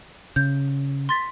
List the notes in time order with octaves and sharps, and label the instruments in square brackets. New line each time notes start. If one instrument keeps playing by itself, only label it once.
[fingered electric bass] C#3 [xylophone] G6
[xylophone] C6 A6 B6